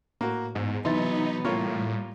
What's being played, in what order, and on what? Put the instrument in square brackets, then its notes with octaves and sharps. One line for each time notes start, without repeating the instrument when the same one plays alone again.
[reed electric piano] A2 [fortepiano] A#3 F#4
[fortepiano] E2 [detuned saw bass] G#2
[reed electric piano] C3 E3 A6 [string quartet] F#3 B3 [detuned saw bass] D#4 [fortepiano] E4 C6
[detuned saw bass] A2 [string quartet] G3 [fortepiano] A#3 F4 C#5